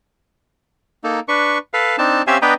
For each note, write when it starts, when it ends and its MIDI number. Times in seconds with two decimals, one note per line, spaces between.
1.04 1.20 58
1.04 1.20 63
1.04 1.20 69
1.28 1.58 62
1.28 1.58 71
1.28 1.58 85
1.74 1.96 69
1.74 1.96 71
1.74 1.96 77
1.98 2.22 60
1.98 2.22 62
1.98 2.22 63
1.98 2.22 81
2.27 2.38 60
2.27 2.38 61
2.27 2.38 67
2.27 2.38 76
2.27 2.38 77
2.27 2.38 80
2.42 2.54 59
2.42 2.54 62
2.42 2.54 71
2.42 2.54 75
2.42 2.54 79
2.42 2.54 82